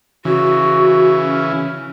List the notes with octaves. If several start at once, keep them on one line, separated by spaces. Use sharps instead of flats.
C#3 E3 F#4
C#4